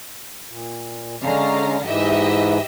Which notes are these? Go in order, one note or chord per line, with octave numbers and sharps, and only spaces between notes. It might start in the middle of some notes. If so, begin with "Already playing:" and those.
A#2
D3 G#3 C#4 F5 A#5
G#2 E3 G4 D#5 E5